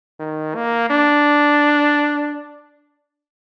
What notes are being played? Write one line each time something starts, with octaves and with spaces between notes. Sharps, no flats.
D#3
A#3
D4